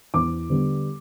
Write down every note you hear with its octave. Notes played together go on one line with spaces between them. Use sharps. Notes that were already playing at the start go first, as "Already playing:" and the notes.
E2 D6
D3 G3 B3